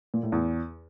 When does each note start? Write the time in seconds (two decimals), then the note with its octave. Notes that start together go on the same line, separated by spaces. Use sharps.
0.14 A#2
0.23 A2
0.32 E2